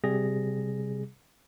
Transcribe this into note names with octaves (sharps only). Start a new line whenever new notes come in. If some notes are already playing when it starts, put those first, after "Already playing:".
C3 G3 G#4 A#6